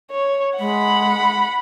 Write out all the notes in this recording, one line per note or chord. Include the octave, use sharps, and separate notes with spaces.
C#5
G#3 F#5 B5